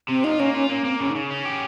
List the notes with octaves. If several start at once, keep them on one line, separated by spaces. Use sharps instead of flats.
C3 C4
D#4 F4
A#3 C#4
C#4 F4
A#3 C#4
A#3 C4
C#3 C#4
D#4
C#3
C#4
G4